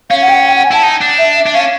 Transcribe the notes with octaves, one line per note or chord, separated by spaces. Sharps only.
C#4 F5
F#5
G5
F#5
G5
F#5
G#5
E4 A5
D#4
D4
E5
E5
D4
C#4 F5